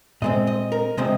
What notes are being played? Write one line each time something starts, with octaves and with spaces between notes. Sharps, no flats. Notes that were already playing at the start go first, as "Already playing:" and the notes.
A#2 G#3 C4 D#5
D#5
A#4
C3 F3 G#3 C4 D#5